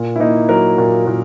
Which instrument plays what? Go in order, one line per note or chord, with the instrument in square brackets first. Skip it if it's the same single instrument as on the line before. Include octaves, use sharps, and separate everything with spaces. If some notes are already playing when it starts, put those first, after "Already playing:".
Already playing: [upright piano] A#2
E4
A#3 D#4
F#3 A#4
A#2
A#2